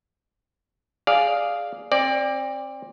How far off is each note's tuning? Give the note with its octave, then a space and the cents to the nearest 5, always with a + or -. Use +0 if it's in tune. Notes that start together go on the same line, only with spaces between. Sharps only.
G#4 +5 D5 +0 F5 +0
C4 +30 D5 +0